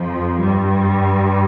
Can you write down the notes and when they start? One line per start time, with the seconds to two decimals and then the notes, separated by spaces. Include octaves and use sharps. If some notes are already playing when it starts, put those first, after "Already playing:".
Already playing: F2 F3
0.40 G2 G3